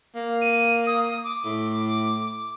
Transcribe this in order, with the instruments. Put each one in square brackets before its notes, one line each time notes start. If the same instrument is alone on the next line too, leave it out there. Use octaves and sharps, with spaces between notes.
[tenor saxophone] A#3
[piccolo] D#7
D#6
D6
[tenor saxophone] A2